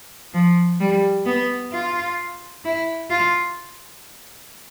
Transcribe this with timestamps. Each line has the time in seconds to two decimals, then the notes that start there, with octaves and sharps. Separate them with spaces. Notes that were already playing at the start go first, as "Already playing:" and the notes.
0.34 F3
0.81 G3
1.26 B3
1.73 F4
2.65 E4
3.10 F4